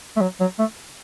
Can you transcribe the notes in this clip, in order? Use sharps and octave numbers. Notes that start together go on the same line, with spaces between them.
A3
F#3
F#3
A3